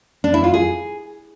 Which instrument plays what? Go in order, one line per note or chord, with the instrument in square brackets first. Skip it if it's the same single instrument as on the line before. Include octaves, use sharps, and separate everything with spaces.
[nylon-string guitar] D4
E4
F4
G#4